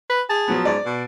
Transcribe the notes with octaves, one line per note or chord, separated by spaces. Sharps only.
B4
G#4 A5
F3 F#3 B3
G#2 D5
B2